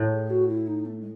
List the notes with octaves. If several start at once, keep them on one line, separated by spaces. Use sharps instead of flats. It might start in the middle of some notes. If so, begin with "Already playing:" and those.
Already playing: A2
G#4
F#4
E4
D#4
A3
G#3